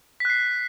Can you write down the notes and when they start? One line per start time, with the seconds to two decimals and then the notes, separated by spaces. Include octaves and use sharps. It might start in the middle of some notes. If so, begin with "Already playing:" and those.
0.20 B6
0.25 F#6
0.30 C7